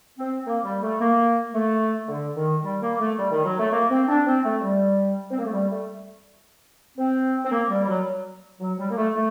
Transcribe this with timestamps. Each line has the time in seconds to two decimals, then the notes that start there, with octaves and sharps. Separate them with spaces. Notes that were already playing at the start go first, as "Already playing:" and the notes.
0.19 C4
0.46 A#3
0.64 G3
0.82 A3
1.00 A#3
1.54 A3
2.09 D3
2.36 D#3
2.63 G3
2.81 A#3
2.99 A3
3.18 G3
3.31 D#3
3.45 F#3
3.58 A3
3.72 A#3
3.89 C4
4.08 D4
4.26 C4
4.44 A3
4.62 G3
5.31 C4
5.38 A#3
5.45 A3
5.52 G3
5.70 A3
6.97 C4
7.45 C4
7.52 A#3
7.69 G3
7.84 G3
7.87 F#3
8.60 F#3
8.78 G3
8.90 A#3
8.96 A3
9.14 A3